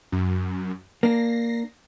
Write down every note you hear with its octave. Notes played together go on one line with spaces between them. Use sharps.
F#2
A#3 D4 A#6 C7